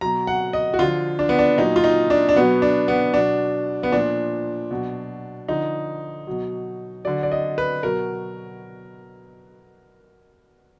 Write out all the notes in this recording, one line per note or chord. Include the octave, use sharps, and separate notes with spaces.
B2 F#3 A#5
F#5
D#5
F#4
D3 F3 F4
D4
B3
D4
A#2 F#3 D#4
F4
D#4
D4
D4
B2 F#3 B3
D4
B3
B2 F#3 D4
B3
A#2 F3 D4
B2 F#3
D3 F3 D#4
B2 F#3
D3 F#3 D5
D5
D#5
B4
B2 F#3 A#4